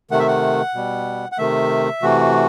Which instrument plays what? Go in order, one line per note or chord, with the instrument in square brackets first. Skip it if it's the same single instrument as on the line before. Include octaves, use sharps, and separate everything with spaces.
[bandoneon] C3 D#3 A3 F#5
E5
F#5
B2 G3
F#5
C3 D#3 A3 E5
C3 E3 A3 F#4